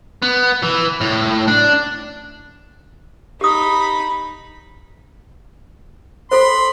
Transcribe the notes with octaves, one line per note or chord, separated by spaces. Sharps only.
B3
E3
A2
D4
D#4 G4 B5 D#6
A4 C5 B5 C6